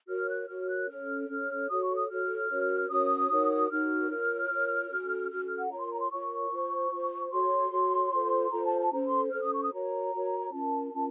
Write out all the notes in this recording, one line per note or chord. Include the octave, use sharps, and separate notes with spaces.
F#4 A#4 C#5 F6
F#6
F#4 A#4 C#5 F6
F#6
C#4 A4 C#5 F6
C#4 A4 C#5
F#4 A4 C#5 D#6
C#6
D#6
F#4 A4 C#5 F6
C#4 F#4 A#4 C#5
C#4 F#4 A#4 C#5 D#6
D#4 F#4 A#4 C#5
D#4 F#4 A#4 C#5 F6
F4 A#4 C#5
F4 A#4 C#5
C#4 F#4 A4
C#4 F#4 A4 F6
F6
F#5
F4 A#4 C#5 A#5
C6
A#5
C6
F4 A#4 C#5 C#6
F4 C5
F4 C5
F#4 A4 C#5 C6
F#4 A4 C#5
F4 A4 C5
F4 A4 C5 A#5
A5
A5
C#4 A4 C5 A#5
C6
C#4 A4 C5 F6
D#6
C#6
D#6
F#4 A#4 C#5 A#5
F#4 A#4 C#5
C#4 F4 A#4 A5
C#4 F4 A#4